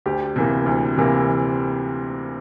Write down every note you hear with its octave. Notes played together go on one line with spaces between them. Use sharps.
D2 G4
C3 E3 A#3
D2
C3 E3 A#3